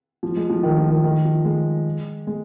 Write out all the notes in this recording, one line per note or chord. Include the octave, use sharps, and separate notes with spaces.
F3
G#3
F3
D#3
F3
D#3
D#3
F3
G#3
G#3